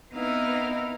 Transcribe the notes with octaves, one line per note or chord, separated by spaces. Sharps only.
B3 C4 D#4 E4 A#4 F5